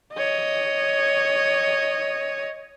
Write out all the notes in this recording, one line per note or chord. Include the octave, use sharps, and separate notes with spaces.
C#5 D#5